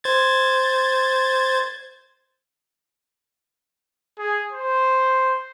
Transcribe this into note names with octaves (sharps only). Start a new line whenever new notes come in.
C5 G#6 A6
G#4
C5